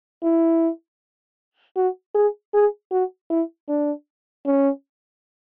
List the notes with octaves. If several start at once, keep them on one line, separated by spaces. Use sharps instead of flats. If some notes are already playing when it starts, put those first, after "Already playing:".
E4
F#4
G#4
G#4
F#4
E4
D4
C#4